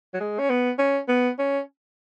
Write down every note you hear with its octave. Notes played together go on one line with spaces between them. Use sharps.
F#3
G#3
C#4
B3
C#4
B3
C#4